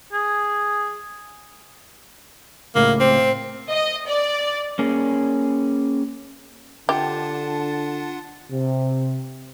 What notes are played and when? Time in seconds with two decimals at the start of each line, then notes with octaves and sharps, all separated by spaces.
0.13 G#4
2.75 C#2 A2 A#3
3.00 C4
3.69 D#5
4.06 D5
4.79 A#3 C#4 G#4
6.89 D3 D4 F4 G4 F#5 A5
8.51 C3